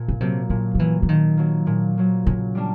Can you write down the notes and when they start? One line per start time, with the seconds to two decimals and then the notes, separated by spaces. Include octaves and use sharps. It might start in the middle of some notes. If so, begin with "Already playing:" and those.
Already playing: A#2
0.08 C#3
0.20 C3 F#3 A#3
0.50 A#2 D3
0.75 F3
0.79 E3 F#3 A#3
1.03 E3
1.09 A#2 D#3
1.37 F#3 A#3
1.67 A#2
1.97 F#3 A#3
2.27 A#2 C#3
2.55 G3 A#3 D4